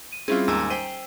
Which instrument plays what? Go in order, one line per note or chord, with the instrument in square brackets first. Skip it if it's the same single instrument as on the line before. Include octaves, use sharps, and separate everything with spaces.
[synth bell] D#7
[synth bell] G3 C#4 G#4 [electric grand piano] C4 E4 F4
[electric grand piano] D#2 G#2 E6 [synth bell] G#5 A#5
[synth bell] C5 B6 [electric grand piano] G5 D#7